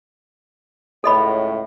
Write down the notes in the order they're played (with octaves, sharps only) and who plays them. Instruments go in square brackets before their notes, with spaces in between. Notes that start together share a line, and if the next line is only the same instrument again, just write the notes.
[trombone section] C#2 A2 [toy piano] A4 D#5 B5